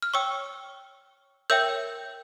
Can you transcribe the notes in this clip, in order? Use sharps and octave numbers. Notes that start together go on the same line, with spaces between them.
F6
C#5 G5 C#6 E6
A#4 C#5 E5 G5 E6 G6